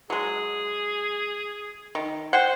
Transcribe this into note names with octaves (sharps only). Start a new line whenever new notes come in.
F#3 G#3 G#4
D#3
C5 F#5 G5